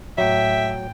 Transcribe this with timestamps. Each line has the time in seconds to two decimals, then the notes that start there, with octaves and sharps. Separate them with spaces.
0.18 A2 F#3 E5 G5